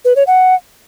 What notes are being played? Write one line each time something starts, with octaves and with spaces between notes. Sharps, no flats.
B4
C#5
F#5